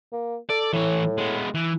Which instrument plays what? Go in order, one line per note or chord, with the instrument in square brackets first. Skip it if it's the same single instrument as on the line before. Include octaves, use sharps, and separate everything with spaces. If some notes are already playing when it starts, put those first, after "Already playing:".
[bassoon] A#3
[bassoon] A4 [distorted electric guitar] D5
[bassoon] A2 [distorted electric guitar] E3 C#5
[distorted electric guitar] G#3 B3
E3